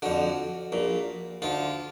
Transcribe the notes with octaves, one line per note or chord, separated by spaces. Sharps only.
F2 D3 F#4
A#1 A#2
D2 D3 F4